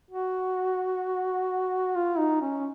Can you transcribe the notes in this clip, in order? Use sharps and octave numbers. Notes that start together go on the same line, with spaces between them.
F#4
F4
D#4
C#4